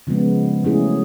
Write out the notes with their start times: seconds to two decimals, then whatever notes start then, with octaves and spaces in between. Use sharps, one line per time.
0.07 C#3 F3 G#3 B3
0.64 F#3 A3 C#4 E4 G#4